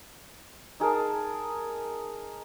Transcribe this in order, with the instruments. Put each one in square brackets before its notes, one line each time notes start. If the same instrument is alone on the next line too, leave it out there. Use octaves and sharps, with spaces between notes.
[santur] D#4 G#4 A#4 A5